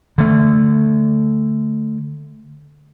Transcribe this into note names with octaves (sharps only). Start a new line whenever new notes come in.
D3 A3